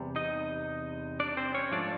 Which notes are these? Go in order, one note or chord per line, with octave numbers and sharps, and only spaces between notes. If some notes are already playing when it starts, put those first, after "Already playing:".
Already playing: E2 C3 G3
D#4 D#5
D4 D5
C4 C5
C#4 C#5
G#2 F3 A3 D4 D5